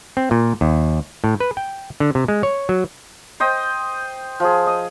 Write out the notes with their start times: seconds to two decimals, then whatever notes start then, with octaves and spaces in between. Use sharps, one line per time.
0.17 C4
0.31 A#2
0.61 D#2
1.24 A2
1.40 B4
1.57 G5
2.00 D3
2.15 C3
2.28 G#3
2.43 C#5
2.69 F#3
3.40 C5 D#5 G5
4.40 F3 G#4
4.66 D#5